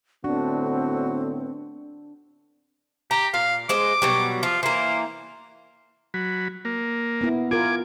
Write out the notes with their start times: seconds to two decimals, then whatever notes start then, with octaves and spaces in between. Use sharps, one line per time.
0.24 A2 D3 B3 C4 D4 F#4
3.11 G4 A#5
3.34 A#2 F5
3.69 G#3 C5 D#5 D6
4.02 B2 F#3 G3
4.43 F3 F4
4.63 E3 A#3 C5
6.14 F#3 B5
6.65 A#3
7.21 B3 E4
7.51 F4 A#4 G#5 D6